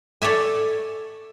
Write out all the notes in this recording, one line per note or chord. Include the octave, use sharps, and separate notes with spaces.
A4 C#5 D5 E5 G#5